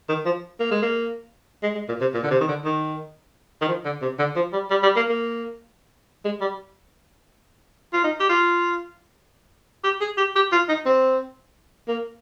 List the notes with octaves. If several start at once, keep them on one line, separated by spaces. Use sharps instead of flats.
D#3
F3
A#3
G#3
A#3
G#3
G#3
A#2
C3
A#2
D3
C3
D#3
D3
D#3
D#3
F3
D3
C3
D3
F3
G3
G3
G3
A#3
A#3
G#3
G3
F4
D#4
G4
F4
G4
G#4
G4
G4
F4
D#4
C4
A#3